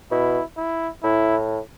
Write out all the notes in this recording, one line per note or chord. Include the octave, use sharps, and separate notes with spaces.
B2 E4
E4
A2 E4